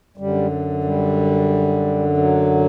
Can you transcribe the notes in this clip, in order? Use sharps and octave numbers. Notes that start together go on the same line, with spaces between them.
F#2 D3 G3
G3
F#3